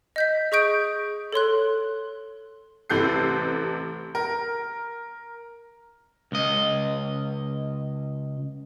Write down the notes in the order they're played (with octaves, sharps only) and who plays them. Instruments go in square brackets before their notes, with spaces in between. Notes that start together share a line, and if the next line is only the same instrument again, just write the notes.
[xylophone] D#5 G6 B6
G#4 D#5 C#6 D#6 G6 D7
A4 C#5 C6 F#6
[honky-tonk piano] A1 C3 E3 A4 G6 C7
A#4
[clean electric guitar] C#2 D#5